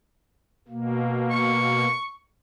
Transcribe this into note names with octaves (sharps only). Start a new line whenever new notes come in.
B2 A#3
C#6